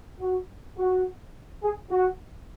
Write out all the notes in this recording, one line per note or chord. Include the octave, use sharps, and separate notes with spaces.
F#4
F#4
G#4
F#4